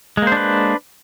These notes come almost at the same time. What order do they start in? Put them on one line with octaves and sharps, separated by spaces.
G#3 A#3 C5 D4 B4